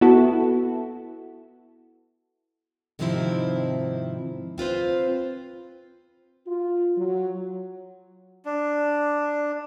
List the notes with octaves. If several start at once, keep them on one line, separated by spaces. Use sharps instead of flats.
B3 E4 F#4 A4
G#2 C3 D#3 F3 C4 E4
C4 F4 B4 C5
F4
F#3
D4